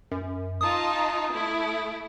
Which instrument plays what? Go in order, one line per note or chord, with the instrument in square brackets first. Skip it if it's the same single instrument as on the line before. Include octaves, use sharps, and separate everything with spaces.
[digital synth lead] F#2
[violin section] D#4 F4 A5 [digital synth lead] D#6
[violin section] A3 E4